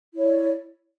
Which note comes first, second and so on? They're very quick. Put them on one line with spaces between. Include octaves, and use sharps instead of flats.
E4 C#5 D5